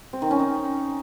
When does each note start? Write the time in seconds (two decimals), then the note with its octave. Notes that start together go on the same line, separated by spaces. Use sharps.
0.13 C4
0.22 D#3
0.31 C#4
0.39 D#4